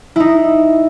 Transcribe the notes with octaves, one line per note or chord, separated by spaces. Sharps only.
D#4 E4